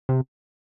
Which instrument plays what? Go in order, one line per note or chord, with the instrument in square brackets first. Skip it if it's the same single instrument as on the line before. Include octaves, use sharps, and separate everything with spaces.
[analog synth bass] C3